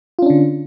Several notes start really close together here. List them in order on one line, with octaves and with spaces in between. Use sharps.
F4 C#4 D4 D3